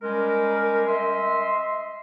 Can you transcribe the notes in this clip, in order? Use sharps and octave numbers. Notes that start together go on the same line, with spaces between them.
G3 G#3 C#4 G4 A#4
D#5 E5 C6